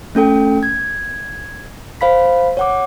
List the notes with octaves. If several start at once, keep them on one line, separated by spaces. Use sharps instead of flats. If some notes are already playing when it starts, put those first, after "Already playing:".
A3 C#4 A4 G5
G#6
C5 F5 B5 B6
C#5 F#5 D6